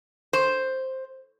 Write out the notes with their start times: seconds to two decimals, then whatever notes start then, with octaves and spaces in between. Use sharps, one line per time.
0.33 C5